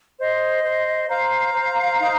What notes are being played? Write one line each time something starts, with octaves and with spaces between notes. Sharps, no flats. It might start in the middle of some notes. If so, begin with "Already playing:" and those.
C5 D#5
C5
C5 F5 A#5
C5
D#4